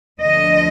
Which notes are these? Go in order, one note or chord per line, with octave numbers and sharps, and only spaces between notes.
D2 D3 F3 D#5